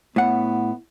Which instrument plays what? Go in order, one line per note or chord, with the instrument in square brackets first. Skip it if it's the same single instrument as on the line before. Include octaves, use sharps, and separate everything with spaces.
[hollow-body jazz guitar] A2 F#5 [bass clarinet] B3